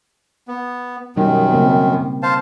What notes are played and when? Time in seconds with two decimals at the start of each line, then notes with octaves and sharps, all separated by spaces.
0.48 B3
1.16 F#2 B2 D#3 G3 D#4
1.52 C#3 A#3 C4
2.23 C5 F5 A5